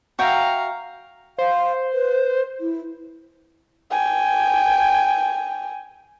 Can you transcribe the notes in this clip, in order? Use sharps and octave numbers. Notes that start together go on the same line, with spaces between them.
F#4 E5 F5 G5 A#5
C5 F5
B4
E4
G5 G#5